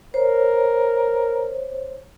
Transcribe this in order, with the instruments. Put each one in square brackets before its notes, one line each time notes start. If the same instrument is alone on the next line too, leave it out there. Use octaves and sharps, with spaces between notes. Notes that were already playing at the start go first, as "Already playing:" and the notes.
[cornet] A#4 [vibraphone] C5 C#5